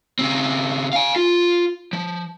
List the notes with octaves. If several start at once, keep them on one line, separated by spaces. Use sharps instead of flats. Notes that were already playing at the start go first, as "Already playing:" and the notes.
C#3 C4
F5 G#5
F4
F3